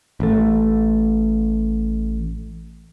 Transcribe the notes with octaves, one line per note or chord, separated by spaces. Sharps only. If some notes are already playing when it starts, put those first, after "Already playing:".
A1 A3